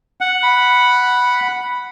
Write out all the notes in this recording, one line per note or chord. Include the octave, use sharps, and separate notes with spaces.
F#5
B5